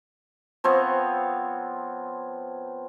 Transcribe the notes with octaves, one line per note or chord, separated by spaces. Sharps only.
F3 B3 C4 C#5